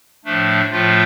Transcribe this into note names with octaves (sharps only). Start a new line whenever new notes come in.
A2 F3 A3 D4
A2 F3 A3 F4